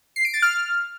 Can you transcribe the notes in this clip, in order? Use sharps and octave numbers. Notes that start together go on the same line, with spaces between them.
C7
D7
A6
F6